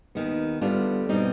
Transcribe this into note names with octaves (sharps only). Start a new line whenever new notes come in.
D#2 D#3 B3
D2 D3 G3 B3 D4 F4
B2 G3 C4 D#4 G4